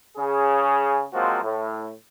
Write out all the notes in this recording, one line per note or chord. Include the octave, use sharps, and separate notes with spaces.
C#3 G#4
F3 F#3 G#3 A#3 C4 F#4
A2